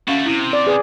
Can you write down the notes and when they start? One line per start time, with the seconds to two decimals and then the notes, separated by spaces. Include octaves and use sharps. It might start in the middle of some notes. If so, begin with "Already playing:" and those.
0.08 A3 C#4 F#4 F5
0.26 C3 E4
0.53 D5
0.67 G#4 B4